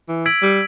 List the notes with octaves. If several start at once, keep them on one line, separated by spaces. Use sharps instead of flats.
E3
E6 G#6 B6 D7 F#7
G3